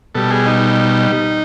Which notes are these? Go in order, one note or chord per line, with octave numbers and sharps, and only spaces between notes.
B2 G3 A4
G#4
D#4